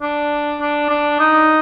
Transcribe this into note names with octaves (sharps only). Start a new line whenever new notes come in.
D4
D4
D4
D#4